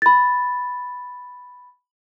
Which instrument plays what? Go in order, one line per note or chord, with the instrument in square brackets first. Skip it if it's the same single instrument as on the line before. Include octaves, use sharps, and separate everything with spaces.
[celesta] B5 A6